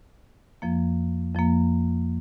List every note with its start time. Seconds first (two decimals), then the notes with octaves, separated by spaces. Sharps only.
0.62 F2 F3 A#3
1.35 F2 F3 A#3